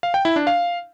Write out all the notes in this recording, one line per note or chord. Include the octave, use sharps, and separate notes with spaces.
F5
G5
E4
D4
F5